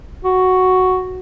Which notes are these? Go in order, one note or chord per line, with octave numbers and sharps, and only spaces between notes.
F#4